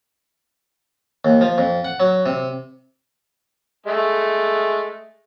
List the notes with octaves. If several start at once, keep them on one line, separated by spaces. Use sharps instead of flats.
D#2
F3
F2
F#5
F#3
C3
G#3 A3